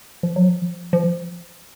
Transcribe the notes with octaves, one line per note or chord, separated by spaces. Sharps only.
F3
F#3
F3
F3